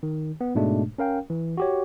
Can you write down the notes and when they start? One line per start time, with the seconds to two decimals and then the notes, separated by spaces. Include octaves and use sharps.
0.03 D#3
0.41 B3
0.55 G#2 B2 G#3 A3 D4
0.98 C#4 A#4 F5 G5
1.30 E3
1.57 F#4 G4 C#5